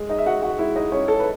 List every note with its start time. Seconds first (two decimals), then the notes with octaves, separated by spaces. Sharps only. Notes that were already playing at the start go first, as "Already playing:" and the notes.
Already playing: G#3
0.09 D#4 D#5
0.18 E5
0.26 G#3 F#4 F#5
0.42 F#4 F#5
0.59 G#3 E4 E5
0.76 D#4 D#5
0.92 G#3 C#4 C#5
1.08 A4
1.19 B4